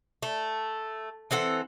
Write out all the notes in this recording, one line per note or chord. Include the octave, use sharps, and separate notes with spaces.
A3
E3 C4 A4 F#5